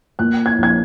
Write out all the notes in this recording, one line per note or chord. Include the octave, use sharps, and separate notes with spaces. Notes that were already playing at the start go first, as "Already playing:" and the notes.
A#2 F#6
G#6
A#1 G#6